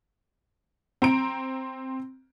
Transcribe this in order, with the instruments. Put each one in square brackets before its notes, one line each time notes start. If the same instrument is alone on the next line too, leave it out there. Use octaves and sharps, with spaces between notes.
[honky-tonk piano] C4 A#5 D7